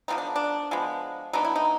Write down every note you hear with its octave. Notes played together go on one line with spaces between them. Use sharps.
D3 F3 G#3 B3 D#4
D4
D4
F3 G#3 B3
F#3 B3 D4 D#4
E4
D#4